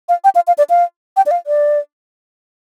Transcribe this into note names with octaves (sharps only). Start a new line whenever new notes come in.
F5
G5
F5
F5
D5
F5
G5
D5
F5
D5